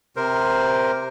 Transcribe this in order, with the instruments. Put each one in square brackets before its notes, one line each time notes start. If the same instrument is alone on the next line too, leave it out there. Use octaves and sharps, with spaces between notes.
[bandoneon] C3 A#4 C5